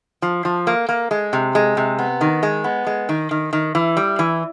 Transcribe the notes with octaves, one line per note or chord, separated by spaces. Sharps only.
F3
F3
A#3
A#3
G#3
C3
G#3
C3
B3
D#3
G#3
B3
G#3
D#3
D#3
D#3
E3
G3
E3